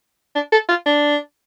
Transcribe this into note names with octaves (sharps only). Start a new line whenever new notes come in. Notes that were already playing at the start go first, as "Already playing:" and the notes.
D4
A4
F4
D4